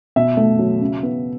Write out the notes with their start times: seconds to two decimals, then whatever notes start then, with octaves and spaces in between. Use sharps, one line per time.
0.16 B2 E5
0.37 A3
0.59 F#3
0.80 C#3
1.03 B3